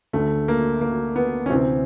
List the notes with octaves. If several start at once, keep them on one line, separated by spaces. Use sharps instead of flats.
D2 D3 A3
A#3
A#3
B3
C#4
D2 C3 E3 C4